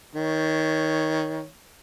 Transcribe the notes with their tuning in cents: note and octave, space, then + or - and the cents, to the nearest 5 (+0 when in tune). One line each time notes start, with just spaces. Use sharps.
D#3 +20 C#5 +0